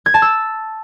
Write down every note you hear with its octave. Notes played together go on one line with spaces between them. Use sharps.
G#6
A5
E6